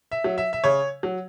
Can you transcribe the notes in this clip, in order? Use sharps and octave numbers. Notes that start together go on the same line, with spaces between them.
E5
F#3
E5
E5
C#3 C#5
F#3